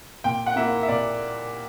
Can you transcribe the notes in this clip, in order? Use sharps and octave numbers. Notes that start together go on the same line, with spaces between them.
A#2 G5
F#5
A#3 E4 E5
E5
A#2 D5